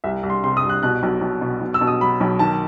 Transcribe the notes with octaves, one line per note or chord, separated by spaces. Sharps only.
C2 E5
C2
C6
C3 C6
D#6
C2
F#6
B2 F#6
B1
B1
B2
B1
E6
B2
D#6
F#3 B5
B1
D#3 A5